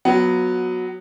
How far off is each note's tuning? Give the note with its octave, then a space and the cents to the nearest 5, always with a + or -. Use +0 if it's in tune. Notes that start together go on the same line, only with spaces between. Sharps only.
F#3 -10 B3 +0 F4 +0